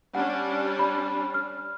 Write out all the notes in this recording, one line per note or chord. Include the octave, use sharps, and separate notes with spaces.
G3 C#4 D4 F#5
B5
F6